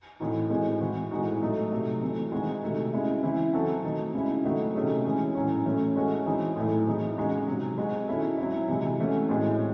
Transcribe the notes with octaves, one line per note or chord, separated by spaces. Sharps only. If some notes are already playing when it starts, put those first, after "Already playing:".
A2 E3 C4 D#4 F#4
A2 G#3 C4
E3 C4 F#4
A2 G#3 C4 D#4 F#4
F#3 A3 D#4
C3 F#3 A3
E3 A3 C4
D#3 G#3 C4 F#4
C3 D#3 A3 D#4
C#3 G#3 C4 E4
C#3 E3 C4 E4
F#3 C4 F#4 A4
D#3 A3 D#4
C#3 G#3 C4 E4
D#3 F#3 A3 C4 F#4
C3 D#3 A3 C#4 G#4
E3 G#3 C#4
A2 F#3 C#4
E3 A3 C#4
G#3 C#4 F#4 A4
E3 C4 D#4 G#4
A2 F#3 A3
E3 C4 D#4 G#4
C#3 G#3 D#4 F#4
C3 F#3 C4
G#3 C4 F#4
D#3 G#3 C#4 E4 A4
F#3 C4 E4
C3 E3 G#3
E3 A3 C#4 F#4
A2 G#3 C4